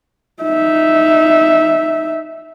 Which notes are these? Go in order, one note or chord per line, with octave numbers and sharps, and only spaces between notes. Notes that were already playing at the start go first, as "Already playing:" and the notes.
D#4 E5